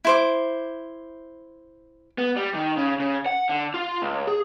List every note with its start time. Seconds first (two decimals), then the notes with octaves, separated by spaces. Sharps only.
0.05 E4 C5 D6
2.18 B3
2.36 G3
2.54 D#3
2.77 C#3
3.00 C#3
3.26 F#5
3.49 D3
3.74 F4
4.02 C#2
4.27 G#4